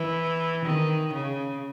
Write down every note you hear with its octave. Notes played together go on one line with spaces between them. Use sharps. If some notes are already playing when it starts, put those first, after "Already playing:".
Already playing: E3
D#3
C#3